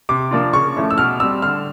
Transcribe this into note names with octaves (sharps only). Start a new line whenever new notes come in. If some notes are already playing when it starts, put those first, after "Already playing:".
C3 D6
F3 A#3 D4 F4
C#3 C#6
F3 A3 C#4 E4
E6
B2 F6
G3 C4 E6
D3 F6